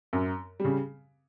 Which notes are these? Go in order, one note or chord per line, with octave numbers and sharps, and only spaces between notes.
F#2
C#3 G3